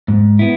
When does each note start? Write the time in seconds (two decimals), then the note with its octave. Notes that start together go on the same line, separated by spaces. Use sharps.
0.08 G#2
0.39 B3 E4